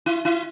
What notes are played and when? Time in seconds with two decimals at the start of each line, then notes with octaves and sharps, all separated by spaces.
0.06 E4
0.25 E4